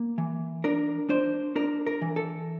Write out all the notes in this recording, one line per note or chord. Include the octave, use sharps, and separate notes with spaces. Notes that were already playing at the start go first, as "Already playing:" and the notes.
Already playing: A#3
E3
D4 A#4
D4 C5
D4 A#4
A#4
E3
A4